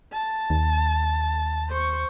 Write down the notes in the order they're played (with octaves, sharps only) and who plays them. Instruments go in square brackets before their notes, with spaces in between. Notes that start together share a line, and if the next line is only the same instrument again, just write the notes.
[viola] A5
[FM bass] D#2
[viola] C5 C#6